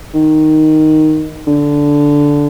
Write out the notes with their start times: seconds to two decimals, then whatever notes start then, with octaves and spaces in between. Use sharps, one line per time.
0.14 D#3
1.47 D3